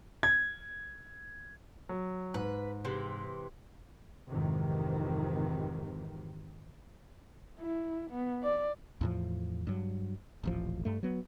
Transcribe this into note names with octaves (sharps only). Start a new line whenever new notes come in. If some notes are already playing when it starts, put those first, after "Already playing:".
G#6
F#3
G#2 B4
C3 E3 G#3
G#1 F2 C3 D#3 E3
E4
B3
D5
E2 A2 F3
G2 F#3
D#1 A1 F3
G2 A3
F#3 B3